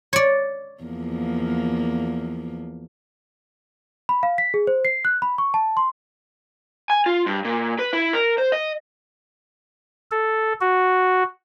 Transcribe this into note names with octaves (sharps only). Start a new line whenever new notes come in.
C#5 D5
E2 F3 A#3
B5
F5
B6
G#4
C5
C7
F#6
B5
C#6
A5
C6
G#5
F4
G2
A#2
B4
E4
A#4
C5
D#5
A4
F#4